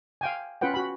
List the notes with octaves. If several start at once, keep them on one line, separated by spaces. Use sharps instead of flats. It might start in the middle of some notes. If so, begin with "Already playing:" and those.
F5 G5 G#5
C#4 F4 B4 F#5 G5
F#4 B5